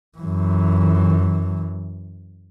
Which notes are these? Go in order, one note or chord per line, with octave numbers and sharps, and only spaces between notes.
F#2 E3